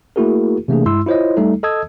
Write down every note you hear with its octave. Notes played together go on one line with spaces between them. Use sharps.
A3 A#3 E4 F#4 G#4 A#4
C3 E3 A3 A#3 D4 G#4
G2 G#3 E4 C6 E6
E4 F4 C5 C#5 D#5
G3 A3 D#4 A4
A4 D#5 A5 D#6 E6 G#6